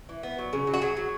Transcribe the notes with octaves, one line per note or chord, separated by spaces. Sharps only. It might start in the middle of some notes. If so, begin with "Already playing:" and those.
E3
B3
F#3
C#3
F#3
F#4
F#3 G#4
F#3